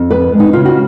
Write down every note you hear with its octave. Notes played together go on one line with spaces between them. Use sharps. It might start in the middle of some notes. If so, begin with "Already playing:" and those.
Already playing: F2
B3 B4
G#3
D#4
C#3 F4
F#4